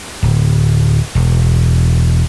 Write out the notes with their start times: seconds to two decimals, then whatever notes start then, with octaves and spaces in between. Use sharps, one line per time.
0.23 D1
1.15 E1